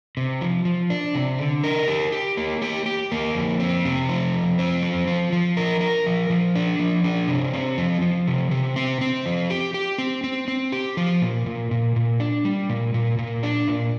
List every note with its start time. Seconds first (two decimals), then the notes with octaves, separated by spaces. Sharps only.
0.17 C3
0.41 F3
0.65 F3
0.90 D4
1.15 C3
1.39 D3
1.64 A#4
1.88 G4
2.12 G4
2.37 A#3
2.62 G4
2.86 G4
3.12 A#3
3.35 F2
3.60 C4
3.85 C3
4.09 F3
4.34 F2
4.59 C4
4.82 F3
5.07 F3
5.33 F3
5.57 A#4
5.81 A#4
6.06 F3
6.30 F3
6.55 D4
6.79 F3
7.04 D4
7.28 C3
7.54 C4
7.78 F3
8.02 F3
8.27 C3
8.51 C3
8.76 C4
9.01 C4
9.26 F3
9.50 G4
9.74 G4
9.98 C4
10.24 C4
10.48 C4
10.72 G4
10.97 F3
11.22 A#2
11.46 A#2
11.71 A#2
11.96 A#2
12.20 D4
12.45 G3
12.69 A#2
12.94 A#2
13.19 A#2
13.43 D4
13.68 A#2